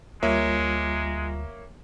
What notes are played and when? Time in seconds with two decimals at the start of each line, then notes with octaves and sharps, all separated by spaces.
0.23 D2 G3 G#3 A#3 F4 C#5 E5